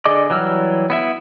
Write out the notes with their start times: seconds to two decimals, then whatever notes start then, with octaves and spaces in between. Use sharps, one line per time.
0.05 D3 G#4 D5 D#5 D6
0.30 E3 F#3 G3 E6 F6
0.90 B3 E4 E5